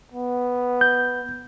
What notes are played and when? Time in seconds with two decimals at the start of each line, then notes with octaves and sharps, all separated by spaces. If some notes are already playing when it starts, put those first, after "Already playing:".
0.12 B3
0.81 G6